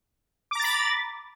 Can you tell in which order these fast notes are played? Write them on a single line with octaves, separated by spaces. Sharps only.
D6 A#5 A6 B5